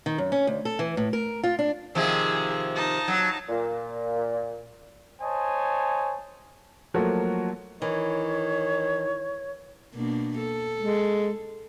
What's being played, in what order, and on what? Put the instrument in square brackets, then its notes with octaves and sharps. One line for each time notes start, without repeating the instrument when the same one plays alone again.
[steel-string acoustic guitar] D#3
F#2
C#4
D2
A4
E3
A2
A#4
F4
D4
[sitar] C3 D#3 F3 [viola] G#4
[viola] D#4 A5
[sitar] F#3
[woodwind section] A#2
[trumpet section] C5 C#5 D#5 G#5 A5
[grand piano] F3 F#3 A3 A#3 F#4 A4
[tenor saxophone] D#3 [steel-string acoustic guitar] E3 [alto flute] C#5
[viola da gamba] B2 A#3 D4
A4
[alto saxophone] G#3